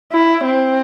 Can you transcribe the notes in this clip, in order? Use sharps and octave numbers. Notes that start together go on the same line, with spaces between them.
E4
C4